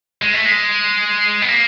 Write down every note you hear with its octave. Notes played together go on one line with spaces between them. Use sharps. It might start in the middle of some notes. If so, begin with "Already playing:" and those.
G#3
A3
G#3
B3
A#3